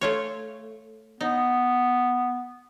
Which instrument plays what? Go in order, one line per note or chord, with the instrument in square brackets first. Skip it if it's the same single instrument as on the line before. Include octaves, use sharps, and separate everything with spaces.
[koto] A3 F4 C#5
[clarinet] B3 [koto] D#4